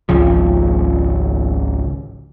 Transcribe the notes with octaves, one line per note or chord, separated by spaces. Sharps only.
G#1 C#2 C#3 F3